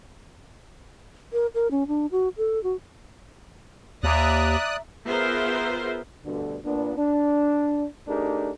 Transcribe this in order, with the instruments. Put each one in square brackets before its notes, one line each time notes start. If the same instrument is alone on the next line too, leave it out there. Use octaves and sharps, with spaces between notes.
[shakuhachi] A#4
A#4
C#4
D4
F#4
A4
F#4
[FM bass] D#2 [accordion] D5 D#6 F#6 [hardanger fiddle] E5 A#5
[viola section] B3 F4 G#4 A#4 C5 E5
[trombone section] D2 G2 B2 D3
A#2 B3 D4
D4
A3 D4 D#4 G4 G#4 A#4